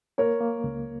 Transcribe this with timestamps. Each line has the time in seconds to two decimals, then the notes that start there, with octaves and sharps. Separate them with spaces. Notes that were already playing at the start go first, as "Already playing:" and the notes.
0.18 A#3 A#4 C#5
0.41 A#3
0.64 C#2